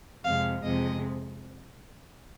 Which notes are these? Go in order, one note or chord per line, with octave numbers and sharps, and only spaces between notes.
F2 C3 G#3 F5
F2 C3 F3 G#3 D#5